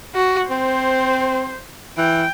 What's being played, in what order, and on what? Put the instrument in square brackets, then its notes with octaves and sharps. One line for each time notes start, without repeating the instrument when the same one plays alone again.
[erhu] F#4
[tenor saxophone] C4 [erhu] C5
[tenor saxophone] E3 [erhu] G5